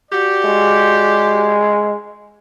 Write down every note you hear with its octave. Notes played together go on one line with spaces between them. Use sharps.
F#4 G4 D5
G#3